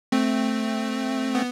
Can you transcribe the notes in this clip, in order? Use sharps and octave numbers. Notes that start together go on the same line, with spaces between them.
A3 C4
B3